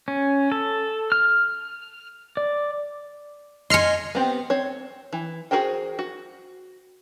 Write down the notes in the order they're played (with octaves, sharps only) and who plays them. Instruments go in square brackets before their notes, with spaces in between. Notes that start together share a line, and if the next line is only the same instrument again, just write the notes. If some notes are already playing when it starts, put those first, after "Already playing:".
[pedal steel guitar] C#4
A4
F6
D5
[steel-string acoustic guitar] D#5 G#5 [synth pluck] C6 F6 C#7
[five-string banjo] B3 C4 G4
C4 C#5
E3
F#4 G#4 A#4 C5 G5
F#4